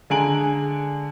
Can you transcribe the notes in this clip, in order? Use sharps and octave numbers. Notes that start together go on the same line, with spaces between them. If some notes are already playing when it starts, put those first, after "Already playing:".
D3 G#3 G#5 A#5 D7 F#7